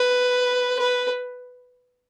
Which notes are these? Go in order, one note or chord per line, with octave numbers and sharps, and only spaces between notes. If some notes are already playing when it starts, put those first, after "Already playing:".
Already playing: B4
B4